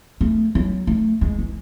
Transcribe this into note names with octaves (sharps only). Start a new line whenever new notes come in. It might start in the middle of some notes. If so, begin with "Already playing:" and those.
A3
F#3
A3
G#3
E3